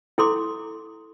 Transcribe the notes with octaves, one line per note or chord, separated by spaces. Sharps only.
E4 A4 C6 D6